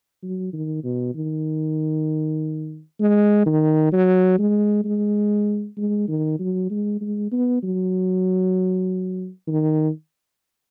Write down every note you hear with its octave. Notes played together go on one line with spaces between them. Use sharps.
F#3
D#3
B2
D#3
G#3
D#3
F#3
G#3
G#3
G#3
D#3
F#3
G#3
G#3
B3
F#3
D#3